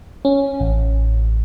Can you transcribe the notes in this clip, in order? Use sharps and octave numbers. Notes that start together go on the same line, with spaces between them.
C#4
A1